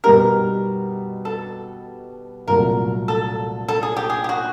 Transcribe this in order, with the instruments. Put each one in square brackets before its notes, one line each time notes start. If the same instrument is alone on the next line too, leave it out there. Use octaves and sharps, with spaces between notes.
[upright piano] B2 G3 B3 D#4 G4 [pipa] A#4
[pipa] A4
[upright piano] C2 A#2 F#3 A3 [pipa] A#4
[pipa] A4
A4
G#4
G4
G#4
G4
F#4